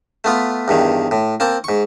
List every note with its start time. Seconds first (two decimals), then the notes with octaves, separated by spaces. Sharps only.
0.24 A3 B3 F4
0.68 E2 G2 D#3
1.11 A2
1.40 A#3 C4 A5
1.64 G#2 C#6